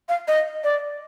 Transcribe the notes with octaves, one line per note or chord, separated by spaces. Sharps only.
F5
D#5
D5